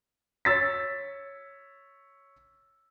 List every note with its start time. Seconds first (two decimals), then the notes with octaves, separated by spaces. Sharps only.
0.45 C#5 E6 A6 B6